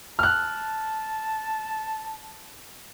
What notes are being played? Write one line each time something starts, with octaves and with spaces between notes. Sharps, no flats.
A5 F6 F#6